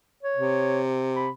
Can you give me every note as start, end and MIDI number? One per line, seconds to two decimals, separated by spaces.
0.23 0.81 73
0.36 1.29 48
1.16 1.30 83